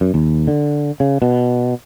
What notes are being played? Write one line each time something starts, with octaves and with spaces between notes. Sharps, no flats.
F#2
D#2
D3
C#3
B2